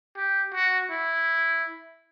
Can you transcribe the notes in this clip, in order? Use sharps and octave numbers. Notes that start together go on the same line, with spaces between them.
G4
F#4
E4